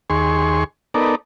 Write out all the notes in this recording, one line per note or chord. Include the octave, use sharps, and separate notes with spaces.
D#2 G#4 C6 C#6
B3 D#4 A4 A#4 D5